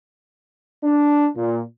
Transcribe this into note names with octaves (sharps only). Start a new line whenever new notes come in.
D4
A#2